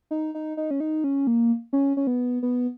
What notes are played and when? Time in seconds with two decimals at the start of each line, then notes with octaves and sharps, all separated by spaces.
0.11 D#4
0.35 D#4
0.57 D#4
0.71 C#4
0.80 D#4
1.04 C#4
1.27 A#3
1.73 C#4
1.97 C#4
2.07 B3
2.43 B3